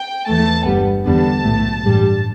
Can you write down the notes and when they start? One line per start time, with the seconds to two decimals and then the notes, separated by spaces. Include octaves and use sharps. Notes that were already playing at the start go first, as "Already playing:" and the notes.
Already playing: G5
0.27 E2 E3 A3 A5
0.66 G1 G2 G3 B3
1.05 E2 D3 G3 B3 A5
1.44 B1 A2 A3
1.83 A1 G2 G3